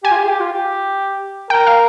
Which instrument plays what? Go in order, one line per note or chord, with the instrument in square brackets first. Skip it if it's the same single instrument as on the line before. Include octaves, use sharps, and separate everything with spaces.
[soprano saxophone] G4 [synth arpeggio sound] G#5
[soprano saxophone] F4
G4
G#4
G4
F4
G4
[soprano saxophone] A#4 [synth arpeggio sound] G5
[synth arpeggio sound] F5